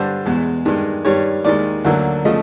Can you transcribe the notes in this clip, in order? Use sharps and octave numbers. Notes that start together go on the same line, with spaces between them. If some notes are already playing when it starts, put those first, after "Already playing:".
Already playing: G2 D3 G3 C5
E2 B2 G#3
G2 D#3 G#3
G2 D#3 G3 C#5
D#2 D#3 G#3 D5
D2 D3 F#3 A#3
C#3 F3 A3 D#5